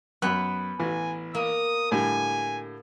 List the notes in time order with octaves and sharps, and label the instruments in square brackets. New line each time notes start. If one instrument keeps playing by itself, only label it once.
[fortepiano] F#2 F#6 [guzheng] B3
[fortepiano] A1 E3 [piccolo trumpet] G#5
[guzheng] A#3 [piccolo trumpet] D#6
[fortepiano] A2 D3 G3 [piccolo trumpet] G#5